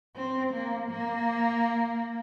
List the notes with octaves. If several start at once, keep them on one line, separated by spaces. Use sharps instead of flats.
C4
A#3
A#3